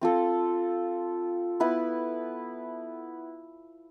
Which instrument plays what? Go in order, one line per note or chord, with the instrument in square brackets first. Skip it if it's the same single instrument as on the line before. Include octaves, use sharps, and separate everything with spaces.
[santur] C4 F4 A4
B3 E4 B4